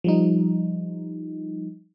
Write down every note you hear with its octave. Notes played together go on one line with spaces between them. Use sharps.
F3 G3 D#4